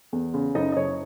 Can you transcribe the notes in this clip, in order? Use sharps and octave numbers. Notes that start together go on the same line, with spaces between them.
E2
C#3
F#1 D#4 D#5
D#5
F#1 C#5